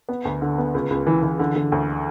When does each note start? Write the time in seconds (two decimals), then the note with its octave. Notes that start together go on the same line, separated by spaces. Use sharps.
0.09 B3
0.25 D2
0.42 D3
0.58 B3
0.75 C#2
0.90 C#2
1.07 E3
1.23 E3
1.39 D3
1.56 D3
1.72 D2